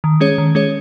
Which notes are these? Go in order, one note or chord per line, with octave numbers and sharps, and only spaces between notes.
D#3
G#3 C#4 G#4 C#5
D#3
G#3 C#4 G#4 C#5